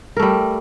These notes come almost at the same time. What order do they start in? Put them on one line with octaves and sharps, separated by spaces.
A#4 A3 G3